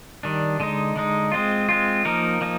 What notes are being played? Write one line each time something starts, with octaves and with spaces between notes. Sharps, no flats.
D#3 G3 D4
D3 G#3 D#4
D3 G#3 D#4
G#3 C4 F4
G#3 C4 F4
F3 A#3 D#4 A#4
F3 A#3 D#4